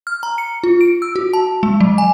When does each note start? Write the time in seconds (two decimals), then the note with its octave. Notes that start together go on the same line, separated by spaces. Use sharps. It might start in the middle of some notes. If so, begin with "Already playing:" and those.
0.07 F6
0.23 A#5
0.38 C#7
0.64 F4
0.81 D7
1.02 E6
1.16 F#4
1.33 A5
1.63 G#3
1.80 F#3
1.98 G#5